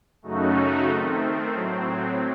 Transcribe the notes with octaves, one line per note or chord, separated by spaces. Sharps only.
F#2 C#3 A3 D#4 F#4
D#3 A3 C4
A2 F#3 C4